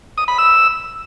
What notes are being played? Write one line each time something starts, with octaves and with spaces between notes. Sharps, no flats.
D#6
B5
E6